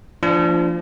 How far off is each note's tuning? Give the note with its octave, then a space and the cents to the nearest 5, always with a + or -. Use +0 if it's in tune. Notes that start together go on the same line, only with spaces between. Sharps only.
F3 -20 A#3 -40 D4 +0